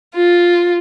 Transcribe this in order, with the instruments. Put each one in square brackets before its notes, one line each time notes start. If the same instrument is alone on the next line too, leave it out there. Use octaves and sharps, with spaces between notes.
[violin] F4